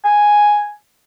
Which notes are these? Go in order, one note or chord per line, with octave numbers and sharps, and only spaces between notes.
G#5